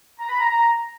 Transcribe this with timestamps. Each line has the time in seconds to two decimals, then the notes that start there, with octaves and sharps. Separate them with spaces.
0.19 A#5
0.29 B5
0.39 A#5
0.50 A#5